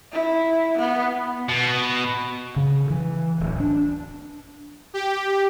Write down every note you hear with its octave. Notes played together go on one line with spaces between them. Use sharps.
E4
B3
B2
C#3
E3
D1
D4
G4